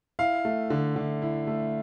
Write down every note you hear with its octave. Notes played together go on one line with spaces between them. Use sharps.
E4 F5
A3
D3
D3
E4
A3